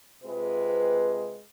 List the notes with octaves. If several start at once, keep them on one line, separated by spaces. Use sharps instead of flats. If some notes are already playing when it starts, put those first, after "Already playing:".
C3 G#3 C4 F4 B4